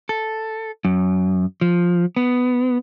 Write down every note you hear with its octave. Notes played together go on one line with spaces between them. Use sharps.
A4
F#2
F3
B3